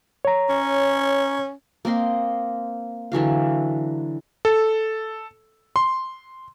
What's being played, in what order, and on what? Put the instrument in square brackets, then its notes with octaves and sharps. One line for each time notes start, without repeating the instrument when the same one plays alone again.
[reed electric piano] C#5 A#5
[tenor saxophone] C#4
[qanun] A#3 C4 D#5 C6
D3 E3 F#3 F5
[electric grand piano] A4
C6